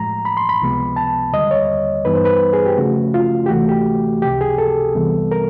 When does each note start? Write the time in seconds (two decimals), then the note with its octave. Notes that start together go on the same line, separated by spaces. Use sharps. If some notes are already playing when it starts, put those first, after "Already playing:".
Already playing: A2 F3 G#3 A#5
0.25 B5
0.37 C6
0.49 B5
0.62 C#2 C3 F3 G#3 B3
0.96 A5
1.33 D#2 D3 G3 D#5
1.51 C#5
2.05 G2 E3 G3 B3 D#4 B4
2.15 C5
2.25 B4
2.53 G#4
2.66 G4
2.77 C#3 F3 A3 C#4 F#4
3.14 F4
3.46 G4
3.50 D2 C3 E3 A3 F#4
3.69 G4
4.22 C#2 C3 F3 G4
4.41 G#4
4.58 A4
4.95 C2 C3 E3 G3 B3
5.32 A#4